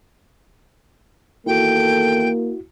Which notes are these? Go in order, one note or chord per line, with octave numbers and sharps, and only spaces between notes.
E2 D#3 A#3 E4 F#4 A4 G5